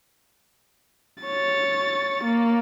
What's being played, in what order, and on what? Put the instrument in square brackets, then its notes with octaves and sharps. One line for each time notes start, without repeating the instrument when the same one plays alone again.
[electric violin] C#5 A6
A#3